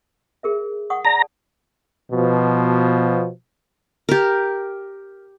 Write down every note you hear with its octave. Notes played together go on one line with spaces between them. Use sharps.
G#4 A#4 E5
F#5 C#6 D#6
D5 A5 A#5
B2 F3
G4 A#4